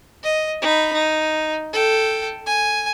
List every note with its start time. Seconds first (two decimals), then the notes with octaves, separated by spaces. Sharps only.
0.23 D#5
0.62 D#4 B5
0.93 D#4
1.73 A4 G5
2.46 G#5